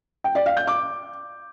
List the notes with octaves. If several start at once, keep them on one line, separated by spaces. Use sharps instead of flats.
G5
D5
F5
G6
D6